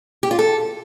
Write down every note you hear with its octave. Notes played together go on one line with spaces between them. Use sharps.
G4
F4
A4